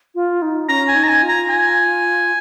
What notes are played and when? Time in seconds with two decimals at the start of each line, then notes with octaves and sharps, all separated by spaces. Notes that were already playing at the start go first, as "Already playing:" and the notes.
0.15 F4
0.42 D#4
0.69 C#4 A#5
0.89 G#5
0.95 D#4
1.04 A#5
1.09 G#5
1.23 F4
1.29 A#5
1.49 G#5